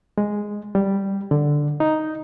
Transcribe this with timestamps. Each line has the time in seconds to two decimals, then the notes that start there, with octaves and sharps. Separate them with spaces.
0.18 G#3
0.75 G3
1.31 D3
1.80 D#4